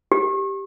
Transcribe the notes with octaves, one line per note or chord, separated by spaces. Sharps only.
G4